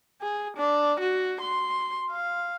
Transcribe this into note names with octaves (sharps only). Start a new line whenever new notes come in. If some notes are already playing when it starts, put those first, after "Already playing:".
G#4
D4
F#4
C6
F5